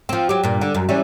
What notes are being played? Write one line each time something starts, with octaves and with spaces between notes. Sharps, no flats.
F3 C4
F#3 G4
G2 A#2
D3
F#2
E3 G3 C#4